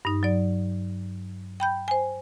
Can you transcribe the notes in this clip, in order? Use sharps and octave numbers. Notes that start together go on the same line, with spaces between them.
G2 D#4
F#3 D5
G5 B5 G6
C5 G#5